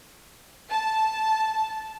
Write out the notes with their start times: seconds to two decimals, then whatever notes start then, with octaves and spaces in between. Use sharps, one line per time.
0.71 A5